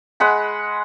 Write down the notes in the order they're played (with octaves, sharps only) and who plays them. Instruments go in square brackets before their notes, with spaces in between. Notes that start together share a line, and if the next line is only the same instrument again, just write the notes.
[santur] G#3 F#5 B5